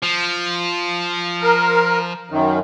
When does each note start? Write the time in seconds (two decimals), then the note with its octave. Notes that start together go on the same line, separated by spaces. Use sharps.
0.03 F3
1.42 A#4
2.30 F#2 D#3